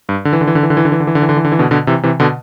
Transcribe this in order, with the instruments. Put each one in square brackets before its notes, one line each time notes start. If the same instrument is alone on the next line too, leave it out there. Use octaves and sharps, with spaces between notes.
[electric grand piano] G2
D3
E3
D3
E3
D3
E3
D3
E3
D3
E3
D3
E3
D3
E3
D3
E3
D3
E3
B2 D3
B2 D3
C3 E3
C3 E3
B2 D3